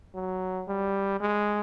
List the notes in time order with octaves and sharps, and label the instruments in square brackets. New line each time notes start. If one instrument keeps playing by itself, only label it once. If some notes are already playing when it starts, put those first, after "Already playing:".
[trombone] F#3
G3
G#3